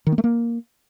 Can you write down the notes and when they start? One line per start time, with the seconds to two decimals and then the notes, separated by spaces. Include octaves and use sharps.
0.07 D#3
0.12 A#3
0.18 A3
0.24 A#3